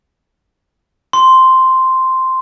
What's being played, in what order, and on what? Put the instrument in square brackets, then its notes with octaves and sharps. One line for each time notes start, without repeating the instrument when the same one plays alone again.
[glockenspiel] C6